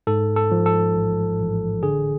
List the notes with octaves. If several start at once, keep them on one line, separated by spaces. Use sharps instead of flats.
G#2 A4
A4
F3
A4
A1
A1
D3 G#4